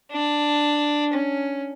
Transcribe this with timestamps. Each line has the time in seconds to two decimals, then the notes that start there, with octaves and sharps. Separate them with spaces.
0.12 D4
1.14 C#4